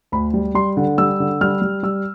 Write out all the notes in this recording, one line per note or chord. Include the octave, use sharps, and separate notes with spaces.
D2 B5
G3
G3 C6
D3
G3 E6
D3
G3 F6
G3
G3 E6